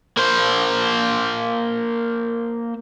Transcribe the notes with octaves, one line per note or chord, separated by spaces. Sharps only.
A#3 C5